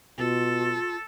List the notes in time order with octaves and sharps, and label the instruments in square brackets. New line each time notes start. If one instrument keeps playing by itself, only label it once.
[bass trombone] B2 [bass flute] F4 [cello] A4